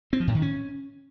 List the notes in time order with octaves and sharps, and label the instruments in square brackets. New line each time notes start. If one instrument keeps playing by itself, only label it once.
[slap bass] C4
F3
A2
D#3
C#4